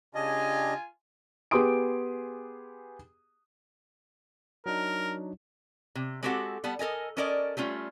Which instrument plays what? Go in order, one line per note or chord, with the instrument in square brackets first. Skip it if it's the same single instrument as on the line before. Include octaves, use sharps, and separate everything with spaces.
[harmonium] C#3 D4 G4 [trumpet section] F4 G#5 [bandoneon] D#5
[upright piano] B3 G4 G#4 C6 D#6 D7
[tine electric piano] F#3 D4 D#4 [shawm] A#4
[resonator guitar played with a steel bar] C3
G#3 C4 F#4 G4 A4 F#5
G3 B3 F#5 A5
A4 A#4 D#5 G#5
C#4 A4 A#4 D5 D#5
G3 A3 C#4 F4